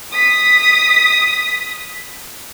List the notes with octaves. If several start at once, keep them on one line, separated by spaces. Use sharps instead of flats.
D#6 B6